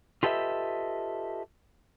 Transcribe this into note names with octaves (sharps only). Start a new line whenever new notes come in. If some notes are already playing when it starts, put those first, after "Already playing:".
F4 G4 A4 B4 D#5 E5